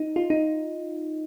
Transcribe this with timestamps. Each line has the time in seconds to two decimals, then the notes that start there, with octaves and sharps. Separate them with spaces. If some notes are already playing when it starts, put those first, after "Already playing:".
Already playing: D#4
0.16 F4
0.30 D#4